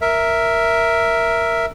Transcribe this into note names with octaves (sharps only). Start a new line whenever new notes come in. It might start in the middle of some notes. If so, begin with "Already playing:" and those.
A#4 E5